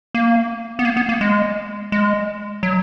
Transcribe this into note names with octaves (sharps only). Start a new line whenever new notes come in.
A#3
B3
A#3
B3
A#3
G#3
G#3
F#3